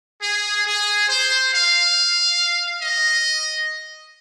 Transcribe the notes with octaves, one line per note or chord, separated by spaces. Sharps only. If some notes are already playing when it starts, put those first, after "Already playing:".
G#4
G#4
C5
F5
D#5